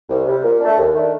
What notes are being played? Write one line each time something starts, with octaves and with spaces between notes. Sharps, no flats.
C2
C3 G3
A#2
A3 D4
D#2
D#3 A3 D4